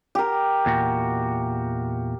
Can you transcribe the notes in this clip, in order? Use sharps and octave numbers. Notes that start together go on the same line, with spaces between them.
G4 A#4
E2 A#2 F#4